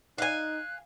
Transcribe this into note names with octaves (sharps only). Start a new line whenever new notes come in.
D#4 F5 G#5 F#6